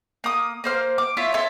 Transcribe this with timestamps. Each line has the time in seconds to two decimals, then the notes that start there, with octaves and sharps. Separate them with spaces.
0.24 A#3 D#6
0.64 A#3 C5 F6
0.98 D6
1.17 E4 F4 C#5 E5
1.34 C#5 E5 A5 C6